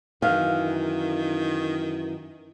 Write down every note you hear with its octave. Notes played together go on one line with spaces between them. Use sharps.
F#2 D#3 E3 F5